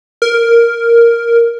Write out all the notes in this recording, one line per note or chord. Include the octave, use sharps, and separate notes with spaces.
A#4